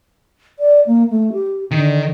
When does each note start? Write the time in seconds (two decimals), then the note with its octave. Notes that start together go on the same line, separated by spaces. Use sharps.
0.59 D5
0.87 A#3
1.10 A3
1.33 G4
1.71 D3 D#3